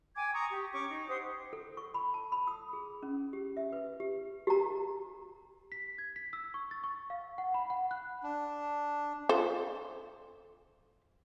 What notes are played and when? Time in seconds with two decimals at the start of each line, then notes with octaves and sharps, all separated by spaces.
0.17 G5 G#5 D6 G#6
0.34 A#5 C#6 D#6
0.50 G4
0.73 C#4 C#6 D6
0.89 D#4
1.08 G4 C5 F#5 D#6
1.53 A4
1.77 C#6
1.94 B5
2.14 A5
2.32 B5
2.47 D#6
2.73 G#4
3.03 C#4
3.33 G4
3.57 E5
3.72 B4
4.00 G4
4.47 G4 A#5
5.72 B6
5.98 G#6
6.16 B6
6.33 E6
6.54 C#6
6.71 A6
6.84 C#6
7.10 F5
7.38 F#5
7.54 B5
7.70 F#5
7.91 F#6
8.23 D4
9.29 F4 A4 C5